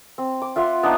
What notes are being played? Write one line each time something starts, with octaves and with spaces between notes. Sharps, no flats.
C4
D6
F4 E5 F#5 C6
B3 D4 D#4 F5